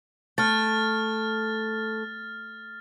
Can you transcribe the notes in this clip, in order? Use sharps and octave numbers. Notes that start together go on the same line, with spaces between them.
A3 F6 A6